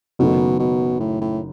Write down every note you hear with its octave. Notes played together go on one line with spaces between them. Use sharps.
F#1 F#2 B2 D#3 A3
B2
A2
A2